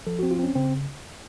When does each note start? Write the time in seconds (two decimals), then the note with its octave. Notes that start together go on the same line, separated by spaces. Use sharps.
0.07 F3 A4
0.19 C4 F#4
0.31 F4
0.39 C4 C#4
0.55 C#3 C4